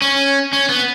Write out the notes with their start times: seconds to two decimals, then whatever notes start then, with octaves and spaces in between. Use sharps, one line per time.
0.02 C#4
0.53 C#4
0.69 B3